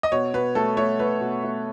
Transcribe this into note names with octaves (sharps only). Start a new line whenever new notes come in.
D#5
B2 C#5
B2 B4
A3 A4
A3 C#5
A3 B4
B2
A3